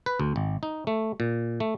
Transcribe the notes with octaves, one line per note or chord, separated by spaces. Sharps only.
B4
D2
G#1
D#4
A3
A#2
A3